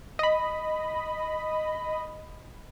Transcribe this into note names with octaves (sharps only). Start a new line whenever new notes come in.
D#5 B5